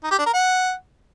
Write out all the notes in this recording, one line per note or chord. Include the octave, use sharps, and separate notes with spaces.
D#4
G4
D4
A#4
F#5